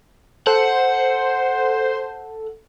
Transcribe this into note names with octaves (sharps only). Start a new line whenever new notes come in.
A4 C5 F#5